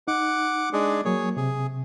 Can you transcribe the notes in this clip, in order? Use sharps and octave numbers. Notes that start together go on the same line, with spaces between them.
D#4 F#5 D6
G#3 D4 G#4
F#3 A#3 G#4 C#5
C3 G#4